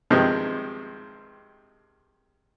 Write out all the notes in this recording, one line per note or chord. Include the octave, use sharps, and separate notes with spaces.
G2 C3 D#3 F3 G#3